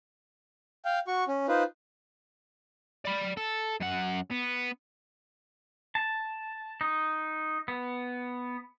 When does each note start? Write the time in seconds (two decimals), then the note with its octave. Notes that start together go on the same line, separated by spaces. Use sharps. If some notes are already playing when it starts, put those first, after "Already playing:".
0.85 F5 G5
1.07 F#4 C#6
1.28 C#4
1.48 D#4 F4 B4 C5
3.05 D5 B5
3.37 A4
3.80 F#2 F#5
4.31 B3
5.95 A5
6.81 D#4
7.68 B3